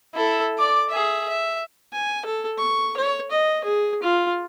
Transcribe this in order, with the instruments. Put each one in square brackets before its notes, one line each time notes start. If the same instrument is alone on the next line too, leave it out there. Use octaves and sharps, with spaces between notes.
[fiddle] E4 A4
D5 D6
G#4 E5
E5
[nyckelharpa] G#5
A4
C#6
C#5
D#5
G#4
F4